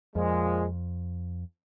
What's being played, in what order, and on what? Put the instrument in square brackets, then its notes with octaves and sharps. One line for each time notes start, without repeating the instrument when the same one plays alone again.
[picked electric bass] F2 [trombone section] A#2 F3 G#3